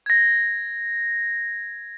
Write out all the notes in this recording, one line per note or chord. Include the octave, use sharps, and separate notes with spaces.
G#6 A#6